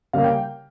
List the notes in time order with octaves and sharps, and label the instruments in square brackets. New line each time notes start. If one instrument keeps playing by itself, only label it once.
[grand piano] C#3 G3 A#3 F5
G5